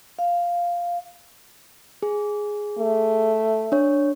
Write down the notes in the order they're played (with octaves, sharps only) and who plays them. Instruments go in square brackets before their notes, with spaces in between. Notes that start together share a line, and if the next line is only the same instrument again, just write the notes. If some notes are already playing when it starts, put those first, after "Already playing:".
[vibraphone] F5
[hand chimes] G#4
[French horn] A3
[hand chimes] D4 C#5